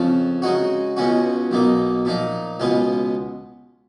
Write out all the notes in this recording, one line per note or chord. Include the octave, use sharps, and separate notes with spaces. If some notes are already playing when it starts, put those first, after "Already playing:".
Already playing: F2 C#3 F3
C#3 G#3 D#4 F#4
C#2 B2 G#3 C#4 F#4
B1 B2 A#3 D#4
A#2 F3 A#3 D#4
C#2 B2 G#3 B3 F4